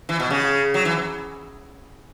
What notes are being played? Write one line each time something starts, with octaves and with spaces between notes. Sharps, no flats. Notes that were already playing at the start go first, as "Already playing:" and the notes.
E3
B2
C#3
F#3
E3